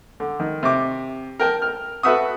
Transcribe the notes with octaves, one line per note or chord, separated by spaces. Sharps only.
D3
D#3
C3 D6
A#4 G5 A5
F6
F#4 A4 B4 E5 F#5 D#6